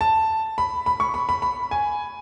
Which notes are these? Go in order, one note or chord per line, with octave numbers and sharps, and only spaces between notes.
A5
B5
B5
C#6
B5
B5
B5
G#5